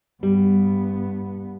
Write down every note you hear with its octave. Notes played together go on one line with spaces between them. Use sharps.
G2 G3 B3